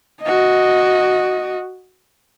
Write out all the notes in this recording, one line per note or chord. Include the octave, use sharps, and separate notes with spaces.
F#4 D#5